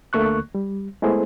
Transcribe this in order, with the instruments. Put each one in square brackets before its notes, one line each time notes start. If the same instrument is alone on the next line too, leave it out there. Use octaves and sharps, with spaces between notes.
[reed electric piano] D2 D3 A3 A#3 C#6 F#6
G3
G#3 A3 B3 E4 G#4 C5